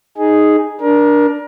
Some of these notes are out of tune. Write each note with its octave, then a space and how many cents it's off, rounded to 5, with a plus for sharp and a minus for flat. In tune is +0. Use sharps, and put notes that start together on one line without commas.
D#4 +0 G#4 +0
D4 +0 A#4 +25